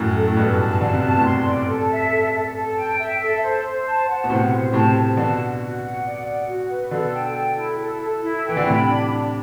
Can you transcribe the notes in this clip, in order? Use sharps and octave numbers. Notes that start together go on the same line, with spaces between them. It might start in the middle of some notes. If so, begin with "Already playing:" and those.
Already playing: F#2 A2
A4
A2
G2 B2 A4
A5
D3 A5
C3
B2 A5
A2 C3
C6
D5
A4
E5
A4
A4
A4
G5
E5
A4
C5
C5
A5
F#5
B2
A2 C3 C5
C5
A2 C3 A5
A5
B2 D3 F#4
F#4
F#4
F#5
D5
F#5
F#4
B4
B2 D3 A4
G5
A4
E4
A4
A4
E4
E3 G5
D3
A2 C3 B5
D4
D4